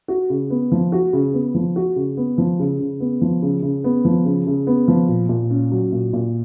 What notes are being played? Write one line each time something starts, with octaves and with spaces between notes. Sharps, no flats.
F#4
C#3
B3
F3
F#4
C#3
B3
F3
F#4
C#3
B3
F3
C#3
C#3
B3
F3
C#3
C#3
B3
F3
C#3
C#3
B3
F3
A#2
A#2
C#4
F#3
A#2
A#2